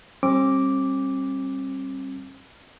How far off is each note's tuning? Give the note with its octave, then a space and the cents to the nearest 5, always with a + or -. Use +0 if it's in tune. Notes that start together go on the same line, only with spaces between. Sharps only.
G3 +0 C4 +45 D6 -5